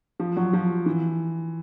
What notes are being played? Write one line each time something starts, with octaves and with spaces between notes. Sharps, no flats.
F3
F#3
F3
E3